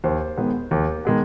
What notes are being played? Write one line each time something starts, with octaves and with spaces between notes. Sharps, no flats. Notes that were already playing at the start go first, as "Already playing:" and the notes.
D#2 C5
D#3 G#3 B3
D#2
D#3 G#3 B3